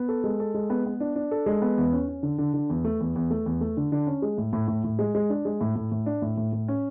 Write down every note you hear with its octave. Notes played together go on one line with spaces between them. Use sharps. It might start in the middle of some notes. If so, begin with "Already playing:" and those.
Already playing: B3
A4
G#3
A4
G#3
B3
B3
D4
D4
A4
G#3
B3
E2
C#4
C#4
D3
D3
D3
E2
A3
E2
E2
A3
E2
A3
D3
D3
C#4
G#3
A2
A2
A2
A2
G#3
G#3
D4
G#3
A2
A2
A2
D4
A2
A2
A2
C#4